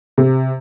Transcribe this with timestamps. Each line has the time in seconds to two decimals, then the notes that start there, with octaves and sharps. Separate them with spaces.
0.18 C3